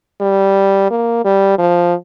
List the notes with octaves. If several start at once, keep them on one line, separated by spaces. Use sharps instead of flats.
G3
A#3
G3
F3